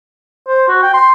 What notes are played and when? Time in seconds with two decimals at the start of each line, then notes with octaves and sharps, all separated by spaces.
0.48 C5
0.68 F#4
0.83 G5
0.94 C6